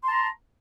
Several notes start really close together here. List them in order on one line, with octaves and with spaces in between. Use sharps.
C6 A5 A#5